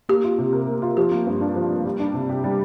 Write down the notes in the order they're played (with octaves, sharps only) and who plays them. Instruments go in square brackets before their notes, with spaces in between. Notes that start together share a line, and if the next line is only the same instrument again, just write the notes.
[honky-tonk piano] A#3 [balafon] G4
[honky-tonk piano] F4
C3
A#4
A#3
F4
[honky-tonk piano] F3 [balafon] G4
[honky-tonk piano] A#3
G2
D4
F3
A#3
G3
D4
C3
G4
G3